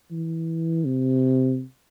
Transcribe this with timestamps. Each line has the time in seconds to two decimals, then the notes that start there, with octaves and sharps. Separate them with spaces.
0.11 E3
0.85 C3